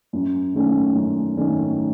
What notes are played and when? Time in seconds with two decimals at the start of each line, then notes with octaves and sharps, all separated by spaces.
0.13 F#2
0.54 D#3 A3 C#4
0.95 F#2
1.37 D#3 A3 C#4